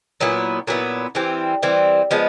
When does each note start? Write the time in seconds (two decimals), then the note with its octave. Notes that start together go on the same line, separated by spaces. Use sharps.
0.21 A#2 F#3 B3 E4
0.67 A#2 F#3 B3 E4
1.15 E3 G3 C4
1.63 E3 G3 C4
2.11 F3 G#3 B3